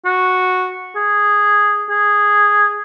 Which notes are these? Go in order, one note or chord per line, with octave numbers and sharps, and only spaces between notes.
F#4
G#4
G#4